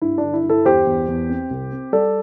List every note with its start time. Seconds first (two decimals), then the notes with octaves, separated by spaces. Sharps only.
0.02 G2 E4
0.18 D4
0.23 D3
0.33 E4
0.45 G2 E4 A4
0.65 E2 G4 C5
0.87 E2
1.08 E2
1.29 C4
1.51 C2
1.72 C4
1.92 G3 A4 D5